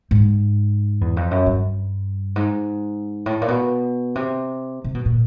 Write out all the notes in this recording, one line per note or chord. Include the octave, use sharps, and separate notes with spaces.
G#2
E2
F2
F#2
G2
G#2
A2
A#2
B2
C3
C3
B2
A#2